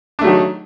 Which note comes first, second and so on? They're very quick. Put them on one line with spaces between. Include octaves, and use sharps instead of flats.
D4 A3 F#3 D#3